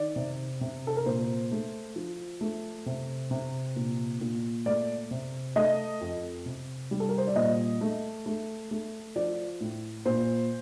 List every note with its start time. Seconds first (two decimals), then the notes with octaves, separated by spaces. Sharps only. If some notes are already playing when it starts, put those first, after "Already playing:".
Already playing: D#3 D5
0.16 C3
0.61 C3
0.87 A4
0.96 A#4
1.06 A#2 C5
1.51 A3
1.96 F3
2.41 A3
2.86 C3
3.31 C3
3.76 A#2
4.21 A#2
4.66 A3 D5
5.11 C3
5.56 A3 D#5
6.01 F2
6.46 C3
6.91 G3
7.00 A4
7.09 A#4
7.18 C5
7.27 D5
7.36 A#2 D#5
7.81 A3
8.26 A3
8.71 A3
9.16 F3 D5
9.61 A2
10.05 A#2 C5